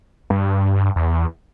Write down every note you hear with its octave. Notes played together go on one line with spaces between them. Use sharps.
G2
E2